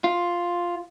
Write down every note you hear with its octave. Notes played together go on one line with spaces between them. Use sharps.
F4